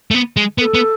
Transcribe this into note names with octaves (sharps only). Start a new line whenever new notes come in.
A3
B3
G#3
B3 B4
A4
B3